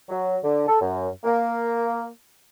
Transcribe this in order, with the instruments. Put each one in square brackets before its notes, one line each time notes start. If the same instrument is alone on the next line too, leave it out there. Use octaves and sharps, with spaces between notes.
[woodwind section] F#3
D3
A4
F#2
A#3